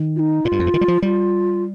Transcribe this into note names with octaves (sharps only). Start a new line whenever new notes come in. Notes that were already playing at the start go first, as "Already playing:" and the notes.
Already playing: D#3
F4
D#4
A#2 F4
G2
F2
G2
D#3
G3
F3
G3 F4